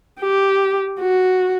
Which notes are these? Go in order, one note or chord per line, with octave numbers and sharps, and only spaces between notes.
G4
F#4